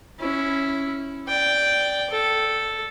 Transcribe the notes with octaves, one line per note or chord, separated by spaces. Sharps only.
C#4 E4
D5 G5
A4